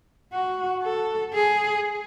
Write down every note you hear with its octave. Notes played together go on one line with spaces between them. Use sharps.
F#4
A4
G#4